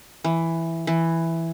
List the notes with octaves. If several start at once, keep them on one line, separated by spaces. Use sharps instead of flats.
E3
E3